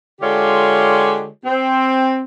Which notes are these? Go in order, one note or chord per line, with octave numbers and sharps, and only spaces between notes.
D3 G#3 F4 G4 C#5 D5
C4